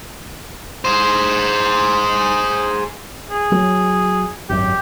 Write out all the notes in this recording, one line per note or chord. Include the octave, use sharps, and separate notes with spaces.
G#4 C5
G#4
F#3
G#1 F#2 G4